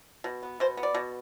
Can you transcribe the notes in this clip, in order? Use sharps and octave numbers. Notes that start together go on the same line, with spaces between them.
B2
B3
B2 C5
B3
D5
B2